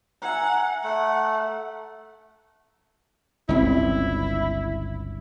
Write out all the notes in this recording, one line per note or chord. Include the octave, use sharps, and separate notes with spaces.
E5 F#5 G#5 A#5
A3 F#5
G1 C#2 C4 E4